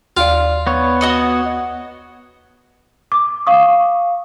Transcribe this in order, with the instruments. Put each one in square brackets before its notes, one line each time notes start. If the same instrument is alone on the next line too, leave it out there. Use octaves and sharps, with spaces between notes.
[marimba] D#2 D5 [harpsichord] F4
[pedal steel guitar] B3 C#5
[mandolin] F#4 D#5 F#5
[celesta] D6
F5 C#6 D#6